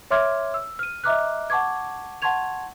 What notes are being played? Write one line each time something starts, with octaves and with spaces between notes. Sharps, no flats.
C#5 E5 C6 D6 F6 G#6
E6
F6 D#7
D#5 E5 A#5 D6 F6 F#6
F#5 A5 C#6 D6 G#6
F#5 A5 C6 C#6 G#6 F7